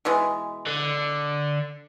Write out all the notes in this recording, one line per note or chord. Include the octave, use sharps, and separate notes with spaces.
B2 E3 G#3
D3